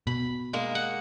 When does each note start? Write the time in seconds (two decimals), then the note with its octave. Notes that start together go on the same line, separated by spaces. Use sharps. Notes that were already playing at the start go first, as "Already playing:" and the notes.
0.07 B2 B5
0.53 G#3 A#3
0.75 F#5